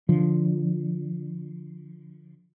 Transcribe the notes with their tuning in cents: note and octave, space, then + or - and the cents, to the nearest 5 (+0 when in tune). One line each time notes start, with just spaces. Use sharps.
D3 +0 F3 +0